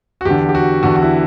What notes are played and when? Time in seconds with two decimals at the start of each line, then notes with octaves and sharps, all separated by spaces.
0.21 F#4
0.25 E2 G4
0.30 D3
0.49 G4
0.55 F#4
0.83 E2 D3 F#4
0.96 F#4
1.02 E4